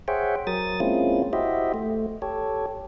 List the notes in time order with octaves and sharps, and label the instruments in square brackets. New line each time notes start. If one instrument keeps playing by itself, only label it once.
[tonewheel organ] G#4 C5 C#5 E5 F#5 G5
F#3 A#4 D#6 A6
G#3 A#3 C4 C#4 E4 F4
E4 F#4 G4 C5 D#5 E5
A3
G4 A4 C#5